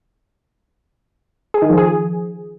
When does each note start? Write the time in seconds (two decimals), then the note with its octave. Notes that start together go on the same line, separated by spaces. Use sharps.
1.54 G#4
1.62 D#3
1.70 F3
1.77 G#4